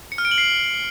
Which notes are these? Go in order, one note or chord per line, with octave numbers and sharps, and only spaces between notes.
C#7
F6
D7
F#7
C7